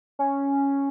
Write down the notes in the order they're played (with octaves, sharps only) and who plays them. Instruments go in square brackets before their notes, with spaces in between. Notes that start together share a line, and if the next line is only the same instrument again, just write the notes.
[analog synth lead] C#4